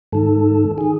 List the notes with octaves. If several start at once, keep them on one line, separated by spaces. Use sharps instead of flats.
G#2 D#3 A4
D#3 G#4